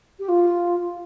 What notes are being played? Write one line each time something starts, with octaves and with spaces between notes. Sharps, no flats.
G4
F4